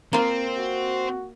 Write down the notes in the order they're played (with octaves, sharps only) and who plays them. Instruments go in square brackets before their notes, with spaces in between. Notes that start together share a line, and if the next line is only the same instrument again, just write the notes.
[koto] A#3 F4 [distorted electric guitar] C4
[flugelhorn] F#4